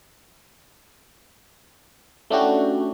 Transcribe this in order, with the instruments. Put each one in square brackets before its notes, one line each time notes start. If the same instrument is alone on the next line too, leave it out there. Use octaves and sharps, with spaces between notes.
[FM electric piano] A3 C#4 D4 E4 F#4 G4